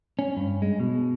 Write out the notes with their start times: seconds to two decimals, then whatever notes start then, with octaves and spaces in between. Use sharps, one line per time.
0.19 C#4
0.37 G2
0.62 G#3
0.80 B2